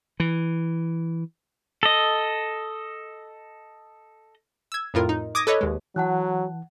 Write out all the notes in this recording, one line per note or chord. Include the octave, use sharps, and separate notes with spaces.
E3
A4 D#5
E6 G#6
F2 A2 F4 A#4
D#4
D6 D#6 G#6 A#6
A4 B4 C#5 D#5
D#2 G#3
E3 F#3 F#5 A5 F#6